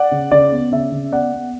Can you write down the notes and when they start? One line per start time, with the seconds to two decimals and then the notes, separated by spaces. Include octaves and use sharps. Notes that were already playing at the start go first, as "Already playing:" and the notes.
Already playing: D5 F#5
0.11 C#3
0.31 C#3 D5
0.52 B3
0.72 C#3 E5
0.92 C#3
1.12 B3 D5 F#5
1.33 B3